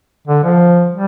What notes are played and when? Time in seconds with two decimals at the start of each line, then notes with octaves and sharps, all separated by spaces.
0.28 D3
0.44 F3
0.92 G3